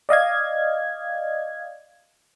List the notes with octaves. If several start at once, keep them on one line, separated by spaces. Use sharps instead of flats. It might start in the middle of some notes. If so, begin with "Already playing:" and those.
D5 D#5 F5 G#6